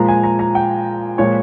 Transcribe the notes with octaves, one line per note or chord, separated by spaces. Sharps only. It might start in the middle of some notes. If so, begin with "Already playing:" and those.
Already playing: A#2 F3 G#3 A#5
G#5
A#5
A#5
G5
A#2 F3 G#3 C#5